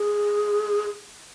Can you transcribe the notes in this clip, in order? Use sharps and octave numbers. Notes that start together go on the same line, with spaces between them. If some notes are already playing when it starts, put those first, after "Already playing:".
Already playing: G#4